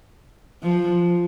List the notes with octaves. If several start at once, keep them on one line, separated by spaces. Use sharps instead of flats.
F3